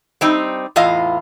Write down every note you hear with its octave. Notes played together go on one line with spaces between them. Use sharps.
G3 C4 D#4
E2 A2 F4 D#5 F5